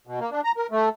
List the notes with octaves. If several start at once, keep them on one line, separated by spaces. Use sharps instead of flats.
B2
A#3
D4
A#5
A#4
A3